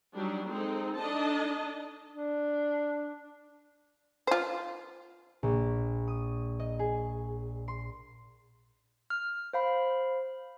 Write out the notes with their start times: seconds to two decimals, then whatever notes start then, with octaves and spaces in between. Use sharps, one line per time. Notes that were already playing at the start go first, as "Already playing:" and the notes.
0.14 F#3 G3 D4 D#4
0.48 G#3 C4 D#4 A4
0.97 D4 D#4 A4 D#5 A5
2.12 D4
4.27 F4 C5
5.43 A#1
6.08 D#6
6.60 D#5
6.79 G#4
7.68 C6
9.10 F6
9.53 C5 F5 B5